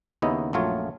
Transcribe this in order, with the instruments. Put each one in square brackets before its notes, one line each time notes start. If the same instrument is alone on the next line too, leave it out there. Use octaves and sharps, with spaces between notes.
[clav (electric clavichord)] D#2 C#3 B3 D#4 E4 D#5
A#1 F#2 F#3 A3 F4 C#5